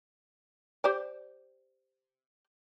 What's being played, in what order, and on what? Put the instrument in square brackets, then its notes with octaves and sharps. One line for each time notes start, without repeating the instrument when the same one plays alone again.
[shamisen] G4 C5 D5